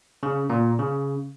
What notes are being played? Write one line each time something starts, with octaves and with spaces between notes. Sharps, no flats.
C#3
A#2
C#3